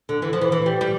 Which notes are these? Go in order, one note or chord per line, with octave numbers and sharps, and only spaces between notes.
D3
E3
F3
E3
E3
G3
G3